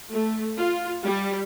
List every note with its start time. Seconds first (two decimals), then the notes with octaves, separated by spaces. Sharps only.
0.11 A3
0.57 F4
1.05 G3